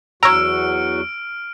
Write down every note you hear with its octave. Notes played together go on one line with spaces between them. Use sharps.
E2 F#3 F#4 C#5 A#5 E6 F6 D7